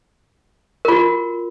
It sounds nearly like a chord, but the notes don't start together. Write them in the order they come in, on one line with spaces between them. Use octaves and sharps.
A#4 F4 F#4